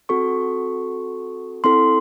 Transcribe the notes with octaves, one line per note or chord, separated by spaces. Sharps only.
C4 F#4 A4 C#6
C4 E4 A4 C6